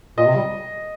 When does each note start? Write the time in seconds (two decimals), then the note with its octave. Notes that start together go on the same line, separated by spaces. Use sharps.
0.18 A#2 D#5
0.27 C3
0.36 G3